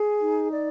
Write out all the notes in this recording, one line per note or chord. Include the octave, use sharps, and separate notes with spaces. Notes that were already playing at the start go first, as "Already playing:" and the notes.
Already playing: G#4
D#4
D5